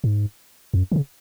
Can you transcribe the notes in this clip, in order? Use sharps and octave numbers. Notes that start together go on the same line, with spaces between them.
G#2
E2
F#2
D3
C#3